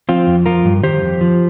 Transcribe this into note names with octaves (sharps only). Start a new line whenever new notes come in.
F3 C4 F4
F2
F3 F4 A#4
G2
D#3 G4 C5
F2
F3